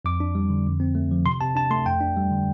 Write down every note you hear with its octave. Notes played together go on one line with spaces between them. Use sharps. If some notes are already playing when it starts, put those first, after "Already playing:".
F2 D6
D4
G3
D3
F2
C4
A3
F3
C3 C6
C3 A5
D4 A5
A3 C6
F2 G5
D4
G3
D3